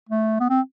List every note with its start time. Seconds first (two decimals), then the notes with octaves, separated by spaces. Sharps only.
0.09 A3
0.40 B3
0.50 C4